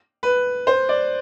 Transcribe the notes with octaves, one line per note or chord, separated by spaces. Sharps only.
B4
C5
D5